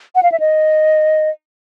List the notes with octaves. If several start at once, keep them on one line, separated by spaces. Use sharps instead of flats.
F#5
F5
E5
D#5